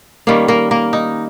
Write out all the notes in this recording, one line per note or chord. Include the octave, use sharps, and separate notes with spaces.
D#3 G3 A#3 C#4
A#3 A#4
A#3 A#4
D#4